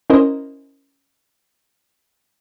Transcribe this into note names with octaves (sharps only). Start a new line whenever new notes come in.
C#4 E4 A#4 C5 D#5